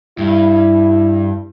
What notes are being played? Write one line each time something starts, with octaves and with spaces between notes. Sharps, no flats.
G2 E4